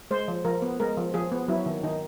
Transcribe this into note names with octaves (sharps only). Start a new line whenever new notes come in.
G#3 C5
F3
F3 A#4
B3
G#3 A#4
F3
F3 G#4
B3
F#3 E4
D#3
D#3 D#4